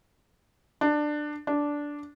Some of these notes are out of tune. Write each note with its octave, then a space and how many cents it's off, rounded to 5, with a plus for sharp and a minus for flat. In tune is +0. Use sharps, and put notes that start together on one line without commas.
D4 +15
D4 -10